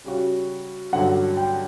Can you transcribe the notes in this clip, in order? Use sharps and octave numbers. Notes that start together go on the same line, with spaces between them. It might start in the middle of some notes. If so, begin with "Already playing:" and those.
C#3 G3 C#4 F#4
G2 D3 F#3 C#4 F#5
G5